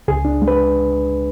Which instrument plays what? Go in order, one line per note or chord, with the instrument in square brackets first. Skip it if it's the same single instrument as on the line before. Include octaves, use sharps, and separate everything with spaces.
[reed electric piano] C#2 G#4
D4
G#3
B4